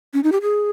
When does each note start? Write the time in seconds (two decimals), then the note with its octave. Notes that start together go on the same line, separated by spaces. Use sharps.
0.14 C#4
0.24 D#4
0.32 G4
0.42 G#4